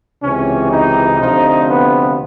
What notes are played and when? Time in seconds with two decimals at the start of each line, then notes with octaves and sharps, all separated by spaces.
0.23 C#2 C3 E3 C#4
0.71 D#4
1.20 D2 C3 F3 D#4
1.69 B3